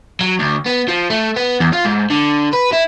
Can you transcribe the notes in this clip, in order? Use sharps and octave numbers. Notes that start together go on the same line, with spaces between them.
F#3
D2
B3
F3
A3
B3
E2
F4
G#2
D3
B4
E4